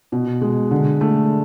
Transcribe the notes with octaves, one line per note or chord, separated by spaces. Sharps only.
B2
G#3
D3
A3